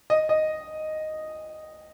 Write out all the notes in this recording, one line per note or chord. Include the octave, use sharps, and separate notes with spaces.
D#5
D#5